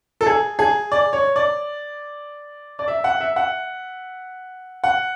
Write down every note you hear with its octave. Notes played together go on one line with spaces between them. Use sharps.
A4
G#4
G#4
D5
C#5
D5
D5
E5
F#5
E5
F#5
F#5